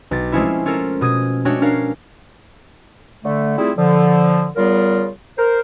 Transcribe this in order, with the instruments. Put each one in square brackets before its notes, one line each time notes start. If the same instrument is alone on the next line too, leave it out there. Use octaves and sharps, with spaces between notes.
[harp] B1 A6
F3 G#3 A3 C4 C#4 E4
C#4 F4 A4 A#4
B2 D#6 G#6 D#7
G#3 A3 D4 F#4 C#5 G5
C#4 D4 A#4 F5
[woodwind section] D3 A3
G3 A3 C4 E4 F4 G#4
D3 F3
C#3 G3 B3 F4 A#4
A#4 C5